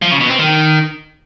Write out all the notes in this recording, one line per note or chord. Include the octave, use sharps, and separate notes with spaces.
F3
C#3
B2
C4
D#3